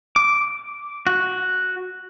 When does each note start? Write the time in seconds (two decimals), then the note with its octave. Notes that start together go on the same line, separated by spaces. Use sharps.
0.16 D6
1.07 F#4